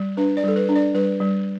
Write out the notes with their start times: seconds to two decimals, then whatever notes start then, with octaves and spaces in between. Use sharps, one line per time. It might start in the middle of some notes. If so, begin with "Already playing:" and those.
Already playing: G3
0.17 D4 B4
0.37 D5
0.44 G3 A4
0.56 B4
0.69 D4
0.76 D5
0.94 G3 B4
1.20 G3